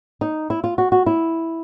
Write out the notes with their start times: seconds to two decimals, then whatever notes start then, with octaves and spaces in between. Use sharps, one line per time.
0.21 D#4
0.50 E4
0.64 F4
0.78 F#4
0.92 F#4
1.06 E4